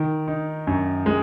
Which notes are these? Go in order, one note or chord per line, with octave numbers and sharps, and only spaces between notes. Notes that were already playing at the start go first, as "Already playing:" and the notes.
Already playing: D#3
D#4
F#2
G#3